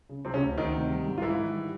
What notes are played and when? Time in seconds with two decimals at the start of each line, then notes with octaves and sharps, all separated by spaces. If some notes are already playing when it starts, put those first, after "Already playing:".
0.09 C#3
0.25 C3 F3 C4
0.34 C#3 C#4
0.42 D2
0.57 D2 D#3 D#4
0.74 C3
0.90 G3
1.07 G#2
1.18 F4
1.22 G#2 E3 E4
1.39 D#3
1.55 G3